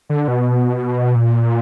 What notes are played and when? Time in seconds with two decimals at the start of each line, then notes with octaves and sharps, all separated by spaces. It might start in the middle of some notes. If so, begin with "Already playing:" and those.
0.09 D3
0.28 B2
1.15 A#2